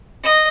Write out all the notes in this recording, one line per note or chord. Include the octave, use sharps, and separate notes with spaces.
D#5